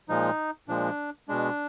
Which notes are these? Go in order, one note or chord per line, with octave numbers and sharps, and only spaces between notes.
A#2 F3 G#3 D#4
A#2 F3 G#3 D4
B2 G#3 D4